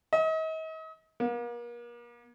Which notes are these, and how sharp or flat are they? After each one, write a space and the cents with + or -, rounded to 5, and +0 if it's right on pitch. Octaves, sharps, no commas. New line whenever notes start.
D#5 +40
A#3 +40